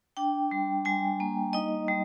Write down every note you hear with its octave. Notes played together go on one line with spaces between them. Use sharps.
D4 G5
G3
G3 G#5
A#3
D#4 D#5
G3